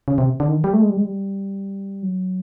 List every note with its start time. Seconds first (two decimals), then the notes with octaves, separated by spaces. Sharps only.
0.08 C#3
0.18 C3
0.40 D3
0.48 D#3
0.64 G3
0.73 A3
0.81 G#3
0.90 G3
0.97 G#3
1.05 G3
2.03 F#3